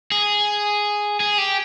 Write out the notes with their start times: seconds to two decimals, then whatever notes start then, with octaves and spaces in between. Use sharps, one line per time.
0.12 G#4
1.20 G#4
1.38 G4